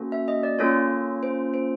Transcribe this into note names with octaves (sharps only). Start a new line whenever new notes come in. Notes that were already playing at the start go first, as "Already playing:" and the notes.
Already playing: A#3 C#4 F#4 A4
E5
D#5
D5
A#3 C#4 F4 A4 C#5
C5
C5